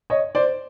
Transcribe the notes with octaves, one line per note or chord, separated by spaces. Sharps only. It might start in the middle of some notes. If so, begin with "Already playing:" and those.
C#5 D#5
C5 D5